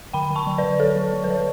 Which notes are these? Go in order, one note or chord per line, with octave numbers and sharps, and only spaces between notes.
D3 G5 B5
D3
A5 C#6
F#3
B4 D5
D3
D3 A4 C#5
F#3
F#3
B4
F#3 C#5